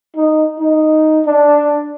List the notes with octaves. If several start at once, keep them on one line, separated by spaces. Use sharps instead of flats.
D#4
D#4
D4